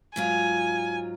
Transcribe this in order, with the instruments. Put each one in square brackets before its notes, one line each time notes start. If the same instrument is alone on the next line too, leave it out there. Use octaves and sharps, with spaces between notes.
[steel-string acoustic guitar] G#2 F#3 F4 [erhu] G#5